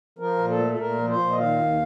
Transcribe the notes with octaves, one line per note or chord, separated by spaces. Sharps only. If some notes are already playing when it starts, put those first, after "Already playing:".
F3 A#4
A#2
A4
A3
A4
A#2 A#4
F3
C5
A#2
D#5
D#3 F5
D#2